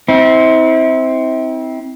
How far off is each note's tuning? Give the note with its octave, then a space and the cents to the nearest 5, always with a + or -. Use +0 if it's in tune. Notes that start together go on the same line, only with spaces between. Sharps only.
C4 +0 E4 -40